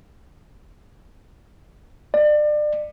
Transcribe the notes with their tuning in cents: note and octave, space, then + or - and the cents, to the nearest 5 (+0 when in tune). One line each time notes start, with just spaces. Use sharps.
D5 +30